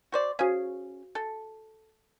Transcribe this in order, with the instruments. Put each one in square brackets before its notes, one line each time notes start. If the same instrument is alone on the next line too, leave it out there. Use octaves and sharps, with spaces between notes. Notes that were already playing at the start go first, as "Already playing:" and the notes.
[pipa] F#4 C5 D5
[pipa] C#4 G#4 [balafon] F#4 C5 F5
[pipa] A4